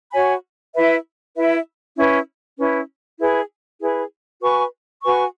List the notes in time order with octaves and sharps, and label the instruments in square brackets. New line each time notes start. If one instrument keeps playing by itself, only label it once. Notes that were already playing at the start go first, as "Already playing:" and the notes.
[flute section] F#4 C#5 G#5 B5
E4 B4 E5
E4 B4 E5
C#4 E4 B4
C#4 E4 B4
E4 G#4 B4
E4 G#4 B4
F#4 B4 G#5 C#6
F#4 B4 G#5 C#6